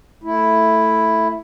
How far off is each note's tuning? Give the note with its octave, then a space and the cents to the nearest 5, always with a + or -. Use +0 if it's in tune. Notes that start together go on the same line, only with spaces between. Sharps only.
A3 +0 E4 +0